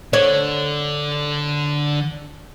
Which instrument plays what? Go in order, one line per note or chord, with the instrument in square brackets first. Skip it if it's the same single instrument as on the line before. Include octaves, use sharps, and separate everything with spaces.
[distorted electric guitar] D3 [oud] C#5